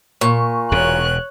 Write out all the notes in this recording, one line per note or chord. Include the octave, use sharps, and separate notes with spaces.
A#2 C#6
E1 E2 B2 C#5 F#6